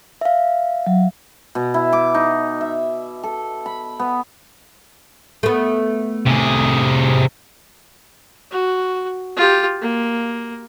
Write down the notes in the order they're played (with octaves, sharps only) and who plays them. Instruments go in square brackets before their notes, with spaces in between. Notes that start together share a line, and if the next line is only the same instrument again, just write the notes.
[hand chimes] E5 F5
[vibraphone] F#3
[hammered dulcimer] B2
E4
D6
D#4
E5
A4
B5
B3
[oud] A3 B3
[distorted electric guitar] C3 G#4
[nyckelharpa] F#4
F4 G4
A#3